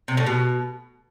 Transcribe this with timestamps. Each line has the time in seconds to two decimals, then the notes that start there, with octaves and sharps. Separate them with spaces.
0.08 C3
0.17 A2
0.26 B2